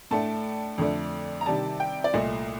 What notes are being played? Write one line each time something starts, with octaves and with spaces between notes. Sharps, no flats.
A2 A3 D4 A5
F2 D3 A3 D4
A#5
C3 D#3 G3 D4 A5
G5
D5
C2 A#2 A3 D#5